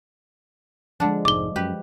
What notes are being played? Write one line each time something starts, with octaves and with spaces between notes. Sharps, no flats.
D3 F3 G#3 D4
F1 G#2 D6 G7
F#2 G4 B4